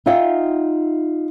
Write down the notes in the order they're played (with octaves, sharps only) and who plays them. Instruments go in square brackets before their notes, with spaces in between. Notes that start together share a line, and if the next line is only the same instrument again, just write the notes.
[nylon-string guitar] D#4 F4 D#5 E5 F#5 G5